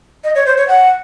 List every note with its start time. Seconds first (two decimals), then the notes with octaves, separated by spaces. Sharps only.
0.24 D#5
0.35 C#5
0.46 C5
0.57 C#5
0.68 F#5